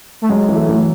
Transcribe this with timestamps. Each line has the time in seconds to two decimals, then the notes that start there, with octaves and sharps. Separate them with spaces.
0.22 A3
0.29 F#3 G#3
0.48 E3
0.56 A3
0.69 E3